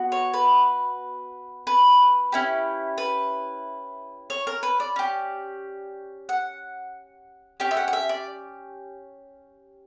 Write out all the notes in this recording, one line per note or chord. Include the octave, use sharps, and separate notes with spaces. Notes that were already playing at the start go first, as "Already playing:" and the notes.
Already playing: B3 F#4
C#5
B4
B4
C#4 E4 G4
B4
C#5
A#4
B4
D5
C#4 G4
F#5
C#4 G4 G5
E5
F#5
F#5
E5
D5